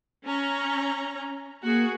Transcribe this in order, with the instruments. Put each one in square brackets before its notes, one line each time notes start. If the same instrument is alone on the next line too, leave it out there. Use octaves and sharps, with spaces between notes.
[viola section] C#4 A#5
[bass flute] A#3 [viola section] F#4 G#4